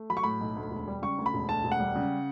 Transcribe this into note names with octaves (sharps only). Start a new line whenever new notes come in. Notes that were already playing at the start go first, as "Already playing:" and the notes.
Already playing: A3
F#3 B5
C#6
A2 B5
B1
D2
E1
G3
C#3 C#6
D2
B5
E1
D2 A5
E1
F#5
G3
C#3